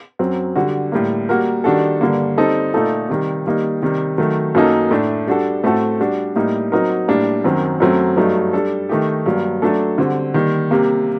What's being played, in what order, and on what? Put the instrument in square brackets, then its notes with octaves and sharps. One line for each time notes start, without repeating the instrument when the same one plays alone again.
[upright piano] F#2 F#3 C4
D3 G3 D4 F#4
A2 G3 A#3
G3 A#3 F#4 A#4
D#3 G3 D4 F#4 A4
G2 D3 G3 A#3
G3 C4 D#4 A4
A#2 A3 D#4 A4
C3 D#3 G3
D#3 G3 A#3 D#4
C3 D#3 G3
D#3 F#3 A3
F#2 F#3 A#3 D#4 A4
A2 A3 D4
G3 D4 F#4 A4
A2 A3 C4 F#4 A4
G3 D4 F#4
A2 G3 A#3 D#4
F#3 C4 D#4 F#4 A#4
A2 G3 A#3 D4
F#2 D#3 F#3 C4
F#2 F#3 A3 C4
G2 F#3 A3 D#4
G3 D4 A4
D#3 A3 D#4 G4
G2 F#3 A#3
F#3 A3 D4 A4
D3 G3 C4 F#4
D#3 G3 A#3
C3 G3 A#3